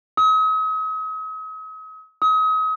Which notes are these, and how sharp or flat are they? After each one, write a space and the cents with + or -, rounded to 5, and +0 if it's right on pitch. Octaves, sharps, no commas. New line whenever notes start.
D#6 +45
D#6 +35